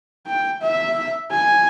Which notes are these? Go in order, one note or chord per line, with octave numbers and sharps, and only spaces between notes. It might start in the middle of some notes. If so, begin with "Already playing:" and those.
G5
E5
G#5